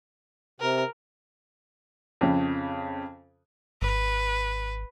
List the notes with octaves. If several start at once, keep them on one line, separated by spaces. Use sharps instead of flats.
C3 A#4
F2 C#3
G#1 B4